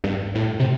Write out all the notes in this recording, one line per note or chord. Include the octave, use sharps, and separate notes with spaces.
G2
A2
C3